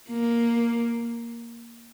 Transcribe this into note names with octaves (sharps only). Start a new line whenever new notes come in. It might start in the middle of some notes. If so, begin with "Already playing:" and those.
A#3